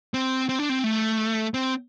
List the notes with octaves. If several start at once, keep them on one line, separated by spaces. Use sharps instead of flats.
C4
C4
D4
C4
A3
C4